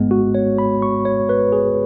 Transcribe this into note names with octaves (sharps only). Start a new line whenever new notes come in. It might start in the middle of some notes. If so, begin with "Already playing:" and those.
Already playing: G#1 G#2 G#3 B3
F#4
C#5
B5
C#6
C#5
B4
G#4